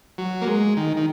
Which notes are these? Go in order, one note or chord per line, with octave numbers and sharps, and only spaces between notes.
F#3
A#3
G#3
D#3
D#3